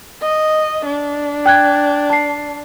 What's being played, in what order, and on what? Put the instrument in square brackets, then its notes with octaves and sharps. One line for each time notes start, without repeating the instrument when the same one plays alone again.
[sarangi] D#5
D4
[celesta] G5 F#6 G#6
A5 C7